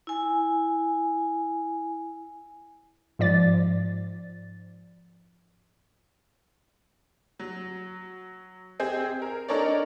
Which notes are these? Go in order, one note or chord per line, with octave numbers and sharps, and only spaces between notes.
E4 G#5
G#2 F3 D5 A6
F#3
C4 G4 G#4
A#4
D4 D#4 A4 A#4 C#5 D5